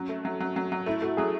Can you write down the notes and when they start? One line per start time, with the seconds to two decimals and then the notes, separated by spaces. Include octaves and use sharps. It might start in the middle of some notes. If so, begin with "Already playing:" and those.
Already playing: F#3 C#4
0.09 A3
0.25 F#3
0.40 F#3
0.56 F#3
0.72 F#3
0.86 A3 E4
1.02 A3 F#4
1.17 F#3 G#4